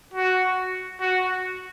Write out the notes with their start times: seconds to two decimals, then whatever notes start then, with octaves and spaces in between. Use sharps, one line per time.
0.14 F#4
1.01 F#4